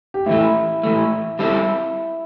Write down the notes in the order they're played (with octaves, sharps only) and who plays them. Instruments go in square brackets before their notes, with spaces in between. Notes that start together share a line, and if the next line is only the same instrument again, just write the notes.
[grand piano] G4
[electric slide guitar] A2 E3 A3 [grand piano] E4
[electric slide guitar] A2 E3 A3
[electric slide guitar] G3 C4 A4 [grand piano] E4